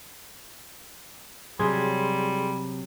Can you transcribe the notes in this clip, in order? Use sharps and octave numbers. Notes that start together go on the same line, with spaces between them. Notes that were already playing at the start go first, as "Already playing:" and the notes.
C3 F#3 G3 G#4 C6 G#6